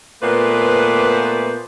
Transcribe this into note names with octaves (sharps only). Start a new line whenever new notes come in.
A#2 A3 B3 B4 C5 D5